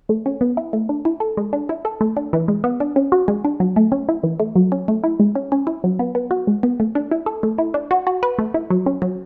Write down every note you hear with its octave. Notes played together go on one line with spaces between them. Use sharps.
A3
C#4
B3
E4
A3
D4
E4
A4
G#3
D4
E4
A4
A3
D4
E3
G#3
B3
D4
C#4
F#4
G#3
D4
F#3
A3
C#4
E4
E3
A3
F#3
C#4
A3
E4
G#3
C#4
C#4
E4
F#3
B3
B3
F#4
G#3
B3
A3
D4
E4
A4
A3
E4
D4
F#4
F#4
B4
A3
E4
F#3
C#4
F#3